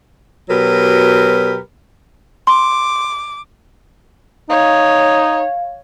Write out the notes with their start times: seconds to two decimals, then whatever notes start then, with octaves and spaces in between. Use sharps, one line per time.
0.49 B2 F#3 G4 A#4 B4
2.47 C6 D6
4.50 D#4 C#5 F5